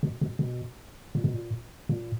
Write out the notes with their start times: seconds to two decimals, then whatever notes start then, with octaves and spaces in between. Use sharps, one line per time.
0.03 B2
0.21 B2
0.39 B2
1.15 A#2
1.24 B2
1.34 A#2
1.89 A#2